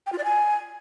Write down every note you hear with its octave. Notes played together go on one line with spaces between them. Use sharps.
G5
F4
D5
G#5